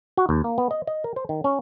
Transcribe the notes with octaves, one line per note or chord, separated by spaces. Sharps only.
F#4
D#2
A#3
B3
D#5
D#5
A#4
C5
D#3
C#4